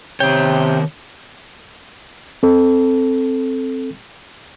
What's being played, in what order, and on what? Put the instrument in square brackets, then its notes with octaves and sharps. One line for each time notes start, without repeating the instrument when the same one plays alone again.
[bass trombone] C3 [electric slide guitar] D#3 C#5 [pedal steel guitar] G5
[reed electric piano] C4 A4